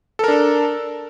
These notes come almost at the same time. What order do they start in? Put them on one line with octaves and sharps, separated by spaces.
A4 A#4 D4